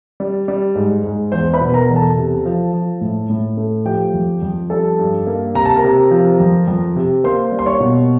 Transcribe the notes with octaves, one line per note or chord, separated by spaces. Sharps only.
G3
G3
G#2
G#2
E2 C5 C6
B4 B5
B2
A#4 A#5
E2
A4 A5
C3
F3
F3
A2
A2
A3
F3 G4 G5
F2
F2
G3 A4 A5
G2
A#3
C3 A#5
A5
A#4 A#5
C3
F3
F2
F2
C3
A#3 C5 C6
G3
C6
C#5 C#6
B2